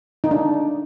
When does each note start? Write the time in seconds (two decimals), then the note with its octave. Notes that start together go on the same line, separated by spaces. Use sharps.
0.24 D#4
0.31 D4